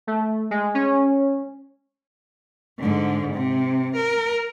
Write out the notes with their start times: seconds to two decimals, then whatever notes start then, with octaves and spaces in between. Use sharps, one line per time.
0.07 A3
0.51 G#3
0.75 C#4
2.79 G#2 D3
3.33 C3
3.96 A#4